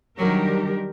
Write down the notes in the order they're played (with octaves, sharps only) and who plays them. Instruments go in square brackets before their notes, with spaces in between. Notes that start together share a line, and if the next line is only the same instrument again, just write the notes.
[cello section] D#3 G3 D4 G4 A#4 [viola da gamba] F#3